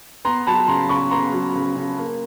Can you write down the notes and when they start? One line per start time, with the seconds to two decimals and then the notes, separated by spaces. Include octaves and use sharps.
0.25 B3 A#5 C6
0.47 F#3 A5 B5
0.68 C#3 A#5 C6
0.89 C#3 B5 C#6
1.11 B3 A#5 C6
1.33 F#3
1.55 C#3
1.76 C#3
1.98 A#3